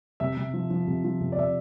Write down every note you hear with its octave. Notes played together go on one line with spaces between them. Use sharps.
C3 E5
C3
F3
F3
C3
F3
C3
D5
C3 E5